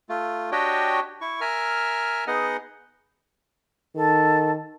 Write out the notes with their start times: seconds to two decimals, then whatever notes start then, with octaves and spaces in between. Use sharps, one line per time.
0.09 A3 F4
0.52 D4 F#4 G4 C#5 D#5 G5
1.21 E4 C#6
1.41 A#4 E5 G#5 F6
2.27 B3 D#4 G#4 D#5 F#5
3.96 D#3 A4